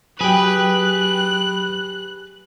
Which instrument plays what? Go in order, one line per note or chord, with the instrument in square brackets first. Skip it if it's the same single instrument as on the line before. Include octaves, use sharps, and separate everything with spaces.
[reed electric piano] F#3 G5 [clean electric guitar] G4 G#4 [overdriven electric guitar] B4 [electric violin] F#6